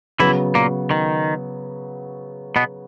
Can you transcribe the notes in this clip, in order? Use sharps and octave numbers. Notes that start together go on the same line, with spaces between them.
C#3 E3 F#3 B3 E4
A#2 A#3
D#3
B2 B3